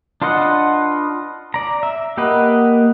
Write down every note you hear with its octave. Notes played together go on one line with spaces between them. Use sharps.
D4 F4 B4 D#5 F#5
D5 A#5
E5
A#3 G4 B4 D#5 F#5